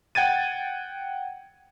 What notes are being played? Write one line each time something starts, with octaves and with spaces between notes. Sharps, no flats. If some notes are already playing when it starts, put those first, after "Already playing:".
F#5 G5 G#6 A6 D#7